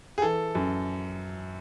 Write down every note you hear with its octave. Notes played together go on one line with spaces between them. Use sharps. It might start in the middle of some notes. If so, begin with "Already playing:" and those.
G#4
E3 A4
F#2